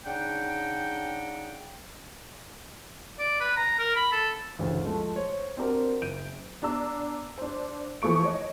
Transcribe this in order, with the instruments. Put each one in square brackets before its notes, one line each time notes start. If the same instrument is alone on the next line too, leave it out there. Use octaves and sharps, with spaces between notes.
[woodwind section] C#3 D4 D#4 F#5 G5
[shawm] D5
B4
A#5
A#4
B5
A4
[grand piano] A1 D2 C#3
F3 G#3 A3
C5 C#5
C4 D4 F#4 G4 A#4 C5
F#1 G6 D7 D#7
[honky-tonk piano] B3 D4 A#5 E6
D4 C5
E3 F3 A3 C#6 D7
C#5 D#5